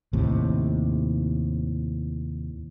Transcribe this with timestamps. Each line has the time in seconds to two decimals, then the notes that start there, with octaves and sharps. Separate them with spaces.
0.13 D#2 A2 C3